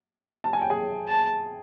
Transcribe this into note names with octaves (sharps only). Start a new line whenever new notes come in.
A5
G#5
G5
G#4 G#5
A5